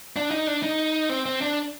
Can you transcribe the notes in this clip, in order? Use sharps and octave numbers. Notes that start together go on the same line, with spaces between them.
D4
D#4
D4
D#4
C4
C4
D4